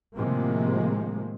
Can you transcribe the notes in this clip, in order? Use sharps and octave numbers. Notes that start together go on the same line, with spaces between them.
A2 C3 D#3 F3 G#3 A#3